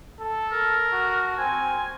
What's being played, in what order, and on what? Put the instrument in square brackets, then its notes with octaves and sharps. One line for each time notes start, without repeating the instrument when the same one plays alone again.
[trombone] A4
[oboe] A#4
[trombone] F#4
[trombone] C4 [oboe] G#5